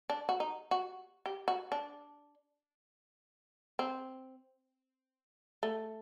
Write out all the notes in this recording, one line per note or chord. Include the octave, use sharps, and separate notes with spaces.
D4
F#4
D#4
F#4
G4
F#4
D4
C4
A3